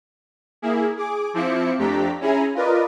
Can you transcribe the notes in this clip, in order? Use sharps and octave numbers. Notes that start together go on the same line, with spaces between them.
A#3 E4 G#4
G#4 D6
F3 C4 E4 D6 C#7
F2 A3 D4 G4 A#5 B6
C#4 E4 G#4 G#5 A#5
F4 A#4 B4 D5 D#5